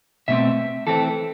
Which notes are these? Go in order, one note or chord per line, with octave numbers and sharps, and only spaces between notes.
B2 A3 C4 E5
E3 A3 C4 A4